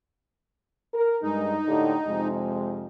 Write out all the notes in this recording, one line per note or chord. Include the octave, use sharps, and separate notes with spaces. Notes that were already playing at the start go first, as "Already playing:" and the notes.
A#4
G2 G#3 D#4
A2 D3 G4
F2 C3 G#3